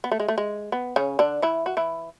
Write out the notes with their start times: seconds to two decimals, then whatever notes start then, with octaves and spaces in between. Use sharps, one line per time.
0.04 B3
0.12 A3
0.20 G#3
0.28 A3
0.38 G#3
0.72 B3
0.96 C#3 C#4
1.19 D3 D4
1.42 E3 E4
1.66 F#4
1.77 E3 E4